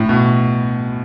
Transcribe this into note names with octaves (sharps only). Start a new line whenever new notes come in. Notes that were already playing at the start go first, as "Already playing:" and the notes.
Already playing: A2
B2